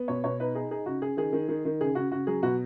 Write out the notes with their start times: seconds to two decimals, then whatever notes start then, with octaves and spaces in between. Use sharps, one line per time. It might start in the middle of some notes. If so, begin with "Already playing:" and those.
Already playing: B3
0.08 B2 C#5
0.24 B2 C#5
0.40 D#4 B4
0.55 D#4 G#4
0.71 D#4 G#4
0.86 C#3 F#4
1.02 C#3 G#4
1.17 D#3 G#4
1.33 D#3
1.48 D#3
1.65 D#3
1.81 C#3 G#4
1.95 C#3 F#4
2.11 C#3 F#4
2.27 F#3 G#4
2.43 B2 F#4